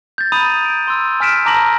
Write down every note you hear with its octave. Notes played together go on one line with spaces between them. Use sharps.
G6 A6
A#5 B5 D#6 D#7 F7
G6 D7
C6 E6
G#5 F6 B6 D7 E7
A5 A#5 D6 A#6 F#7